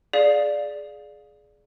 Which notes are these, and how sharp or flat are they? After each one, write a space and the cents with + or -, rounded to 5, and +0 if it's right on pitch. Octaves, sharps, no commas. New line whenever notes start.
G#4 +15 D5 +0 F5 +10